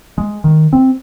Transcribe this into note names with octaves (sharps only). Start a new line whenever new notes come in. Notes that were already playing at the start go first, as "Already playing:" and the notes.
G#3
D#3
C4